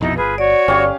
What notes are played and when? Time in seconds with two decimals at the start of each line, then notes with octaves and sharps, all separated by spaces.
0.01 A#1 F2 B2 D#4 E4
0.17 G1 F4 G#4 B4
0.38 F#4 C#5 D5
0.68 G1 C#4 G4 F5